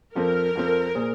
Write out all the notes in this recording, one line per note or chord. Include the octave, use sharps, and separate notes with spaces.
F2 F3 C4 A#4
F2 F3 C4
A#2 A#3 G#4 C5